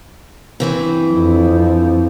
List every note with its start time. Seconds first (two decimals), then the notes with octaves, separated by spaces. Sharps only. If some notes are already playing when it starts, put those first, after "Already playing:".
0.60 G2 E3 C4
1.12 F2 F3